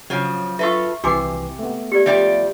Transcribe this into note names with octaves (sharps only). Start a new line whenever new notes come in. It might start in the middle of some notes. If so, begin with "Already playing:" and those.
C#3 F3 F#3
F4 A4 B4 E5 C#6
C2 C3 E3 F#4 G#5 D6 C7
A3 B3
G4 D5
F3 G3 D5 E5